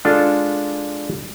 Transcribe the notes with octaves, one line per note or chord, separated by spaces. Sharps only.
G#3 D4 F4 A4